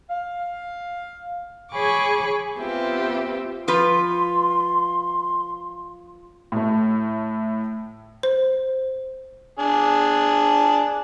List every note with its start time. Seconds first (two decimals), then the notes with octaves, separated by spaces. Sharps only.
0.10 F5
1.72 G#4 C#5 G#5 B5 C#6 D6
2.59 B3 C4 F4 G4 E5
3.68 F3 F4 B4 C6
6.52 A2 A3
8.23 C5
9.59 D4 G#4